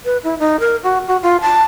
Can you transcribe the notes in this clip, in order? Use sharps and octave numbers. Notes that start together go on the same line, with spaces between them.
B4
E4
D#4
A#4
F#4
F#4
F4
A5